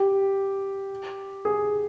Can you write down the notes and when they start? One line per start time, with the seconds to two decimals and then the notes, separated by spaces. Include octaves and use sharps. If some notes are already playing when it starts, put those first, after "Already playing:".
Already playing: G4
1.45 G#4